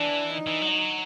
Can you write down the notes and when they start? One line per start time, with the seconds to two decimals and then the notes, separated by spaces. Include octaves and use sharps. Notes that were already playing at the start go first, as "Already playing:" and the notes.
Already playing: E3 D4
0.34 D#4
0.47 E3
0.62 F#3